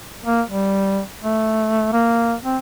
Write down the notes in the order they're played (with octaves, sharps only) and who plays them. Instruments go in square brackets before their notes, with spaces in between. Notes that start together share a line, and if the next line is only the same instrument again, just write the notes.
[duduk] A#3
G3
A3
A#3
C4